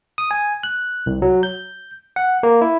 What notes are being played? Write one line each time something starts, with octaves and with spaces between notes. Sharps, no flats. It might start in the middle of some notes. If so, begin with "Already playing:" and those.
D#6
G#5
F#6
C2
F#3
G6
F#5
A#3
E4